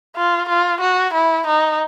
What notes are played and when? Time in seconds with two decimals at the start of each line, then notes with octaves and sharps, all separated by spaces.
0.17 F4
0.50 F4
0.81 F#4
1.14 E4
1.47 D#4